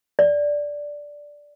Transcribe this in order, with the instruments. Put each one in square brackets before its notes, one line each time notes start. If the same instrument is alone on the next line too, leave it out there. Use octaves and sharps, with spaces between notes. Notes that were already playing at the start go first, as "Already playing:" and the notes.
[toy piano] D5